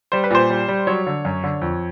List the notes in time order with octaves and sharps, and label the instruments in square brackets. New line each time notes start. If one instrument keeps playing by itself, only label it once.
[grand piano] G3 C5
B4
A#2 C5
G3
G3
F#3 C#5
D3
F#2
D3
F2